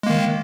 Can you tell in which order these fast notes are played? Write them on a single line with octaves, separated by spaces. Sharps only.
G#3 A#3 D#3